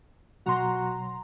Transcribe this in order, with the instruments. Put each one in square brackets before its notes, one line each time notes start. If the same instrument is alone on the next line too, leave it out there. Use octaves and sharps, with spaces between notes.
[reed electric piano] B2 F#3 [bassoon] F#4 [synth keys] A#5 C6